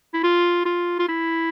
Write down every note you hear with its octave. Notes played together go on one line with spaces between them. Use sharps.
E4
F4
F4
F4
E4